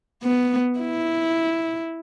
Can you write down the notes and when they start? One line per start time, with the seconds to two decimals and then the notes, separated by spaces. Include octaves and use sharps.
0.23 B3
0.79 E4